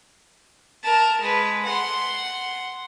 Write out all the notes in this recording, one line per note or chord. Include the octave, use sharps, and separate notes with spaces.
A#4 A5
G#3 B4
F#5 C6